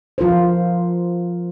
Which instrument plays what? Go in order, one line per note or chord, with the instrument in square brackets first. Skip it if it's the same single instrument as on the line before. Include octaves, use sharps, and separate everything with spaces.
[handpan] F3 F4 A#4 C5